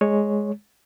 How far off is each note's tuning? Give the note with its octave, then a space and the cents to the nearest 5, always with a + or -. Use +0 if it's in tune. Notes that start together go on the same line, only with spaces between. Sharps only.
G#3 +0 C#5 +0